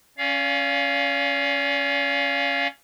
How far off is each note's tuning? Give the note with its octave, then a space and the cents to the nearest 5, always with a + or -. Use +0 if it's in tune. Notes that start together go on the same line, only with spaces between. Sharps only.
C#4 +0 D5 -45 F5 +0